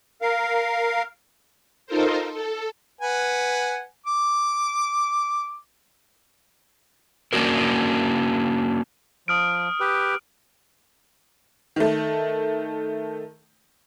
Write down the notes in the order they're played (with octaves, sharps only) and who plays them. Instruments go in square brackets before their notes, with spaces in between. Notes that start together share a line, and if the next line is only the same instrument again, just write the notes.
[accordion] A#4 F5
[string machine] D#4 F4 A4 A#4 C5
A4
[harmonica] B4 F#5 G#5
D6
[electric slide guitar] A#3 C#4 D4 E4 F#4 A#4
[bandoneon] F3 [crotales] D#6 F6 D7
[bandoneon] G4 B4
[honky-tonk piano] D#3 A3